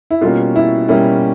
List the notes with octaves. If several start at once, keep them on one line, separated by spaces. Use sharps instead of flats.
E4
B2 G3 A#3 C#4 F4
E4
B2 G3 A#3 C#4 E4